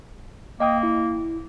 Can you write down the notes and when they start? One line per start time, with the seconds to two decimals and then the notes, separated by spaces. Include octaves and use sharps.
0.60 A#3 D#5 G5 D#6
0.83 E4